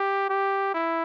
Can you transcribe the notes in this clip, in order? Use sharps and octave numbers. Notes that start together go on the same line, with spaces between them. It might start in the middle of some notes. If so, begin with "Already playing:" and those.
Already playing: G4
G4
E4